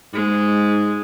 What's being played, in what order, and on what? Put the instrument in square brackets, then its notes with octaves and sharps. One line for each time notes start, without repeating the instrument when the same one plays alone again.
[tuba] G#2 [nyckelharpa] G#3